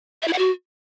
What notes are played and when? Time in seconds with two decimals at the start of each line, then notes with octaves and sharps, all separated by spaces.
0.22 E5
0.28 E4
0.33 F#5
0.38 F#4